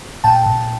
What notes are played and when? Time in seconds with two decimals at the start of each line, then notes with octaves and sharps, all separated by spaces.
0.24 A#2 G5 A5
0.46 A#2